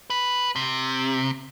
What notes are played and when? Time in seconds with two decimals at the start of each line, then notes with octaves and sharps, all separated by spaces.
0.10 B4
0.56 C3